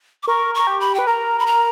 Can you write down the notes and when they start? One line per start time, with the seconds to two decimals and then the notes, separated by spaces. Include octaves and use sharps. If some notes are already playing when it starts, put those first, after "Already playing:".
0.23 D6
0.27 A#4 C#6
0.55 A#4 C#6
0.67 G4
0.80 B5
0.95 B4 G5
1.07 A#4 A#5
1.39 B5
1.46 A#5